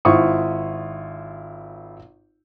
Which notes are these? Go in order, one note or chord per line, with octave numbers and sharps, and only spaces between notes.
G#1 E4 F4 C5 C#6 D#6